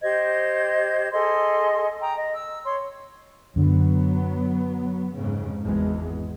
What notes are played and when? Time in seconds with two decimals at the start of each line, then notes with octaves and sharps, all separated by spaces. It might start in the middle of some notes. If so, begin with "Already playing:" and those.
0.02 G4 C5 D#5 G#6
1.12 G#4 A4 D#5 C6
2.01 G5 A#5 D#6
2.15 D#5
2.34 E6
2.65 C#5 C6
3.56 F#2 D3 F#3 B3
5.15 F2 G#2 C#3
5.63 G#1 E2 G#3